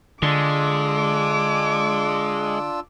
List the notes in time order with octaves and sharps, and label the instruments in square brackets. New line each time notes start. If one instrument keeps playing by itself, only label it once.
[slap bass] D3 [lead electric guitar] G#3 [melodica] D4 F4 E6 [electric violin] D6